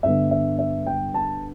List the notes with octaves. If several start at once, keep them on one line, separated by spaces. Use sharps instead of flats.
G2 D3 B3 E5
E5
E5
G5
A5